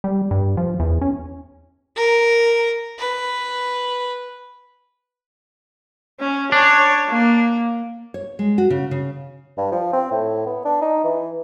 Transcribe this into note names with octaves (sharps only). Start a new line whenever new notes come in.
G3
G2
F3
E2
C#4
A#4
B4
C#4
D4 C#5
A#3
C#5
G#3
F#4
C#3
C#3
G2
F3
C4
A2
B3
D4
D#4
E3